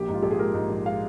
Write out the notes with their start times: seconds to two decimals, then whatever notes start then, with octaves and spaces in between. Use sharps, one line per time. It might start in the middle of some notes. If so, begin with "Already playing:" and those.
Already playing: A#1 G4
0.08 G#2
0.14 F4
0.22 A#1 G4
0.31 G#4
0.39 G#3 A#4
0.54 G#2
0.69 A#1
0.86 G#3 F5